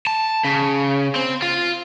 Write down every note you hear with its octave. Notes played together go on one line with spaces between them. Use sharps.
A5
C#3
C4
F4